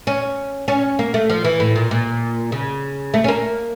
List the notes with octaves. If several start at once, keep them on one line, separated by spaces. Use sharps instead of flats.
C#4
C#4
A#3
A3
F3
E3
A2
A#2
A#2
C#3
A3
C#4
A#3